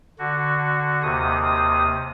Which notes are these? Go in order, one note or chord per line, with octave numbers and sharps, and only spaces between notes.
D3 F#4
D#2 C3 D#6